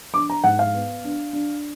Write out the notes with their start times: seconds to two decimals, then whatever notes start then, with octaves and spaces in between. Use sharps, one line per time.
0.14 D4 D6
0.30 A#5
0.44 G#2 F#5
0.59 F5
0.74 B3
1.04 D4
1.33 D4